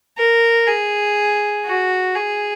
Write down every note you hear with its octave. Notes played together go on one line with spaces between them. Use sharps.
A#4
G#4
F#4
G#4